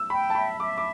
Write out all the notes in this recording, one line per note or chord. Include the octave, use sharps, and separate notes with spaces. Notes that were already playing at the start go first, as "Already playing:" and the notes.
Already playing: E6
G5 B5
A5
E5 B5
E5 D6
D6